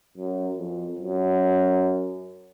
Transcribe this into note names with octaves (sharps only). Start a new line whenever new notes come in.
F#2
F2
F#2